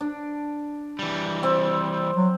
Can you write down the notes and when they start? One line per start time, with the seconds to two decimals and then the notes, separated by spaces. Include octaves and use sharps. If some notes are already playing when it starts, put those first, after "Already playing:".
0.01 D4
0.99 E3 G3
1.43 C4
2.17 F#3